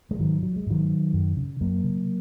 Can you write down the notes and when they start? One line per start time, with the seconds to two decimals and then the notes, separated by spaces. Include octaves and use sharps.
0.11 G#3
0.19 G#2 D#3 F#3
0.43 F#3
0.56 G#3
0.67 G#2 D#3 F#3
1.13 F#2
1.37 C#3
1.61 F#2 F#3 A#3
1.84 C#3